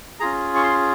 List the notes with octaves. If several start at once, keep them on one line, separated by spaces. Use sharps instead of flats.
C#4 F4 G#4 A#5
C#6
C6